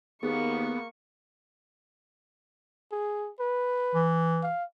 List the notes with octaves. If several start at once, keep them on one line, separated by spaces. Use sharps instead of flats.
D#2 A#3 B3 G#4 C#6
G#4
B4
E3
F5